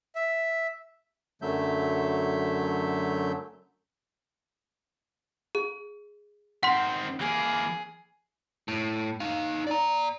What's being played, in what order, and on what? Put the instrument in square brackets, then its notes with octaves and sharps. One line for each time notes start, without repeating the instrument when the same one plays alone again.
[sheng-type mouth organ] E5
[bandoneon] F#2 D3 F#3 A3 E5 G6
[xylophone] G#4
[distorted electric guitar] D#3 C4 [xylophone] F#5 C6
[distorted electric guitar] E3 A#3 [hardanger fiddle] G#4
[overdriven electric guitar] A2
D#4 F5
D5 A#5